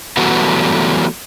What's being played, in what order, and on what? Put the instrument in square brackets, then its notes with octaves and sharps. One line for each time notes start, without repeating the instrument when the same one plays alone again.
[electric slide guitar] E3 F#3 G3 A3 B3 F#4